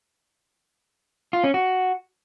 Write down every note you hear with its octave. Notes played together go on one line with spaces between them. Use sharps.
F4
C#4
F#4